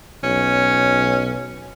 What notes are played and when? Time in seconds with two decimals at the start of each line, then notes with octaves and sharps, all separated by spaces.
0.24 B1 C#4